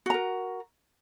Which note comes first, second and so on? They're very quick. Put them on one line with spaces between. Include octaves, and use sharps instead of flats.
F#4 A#5 A#4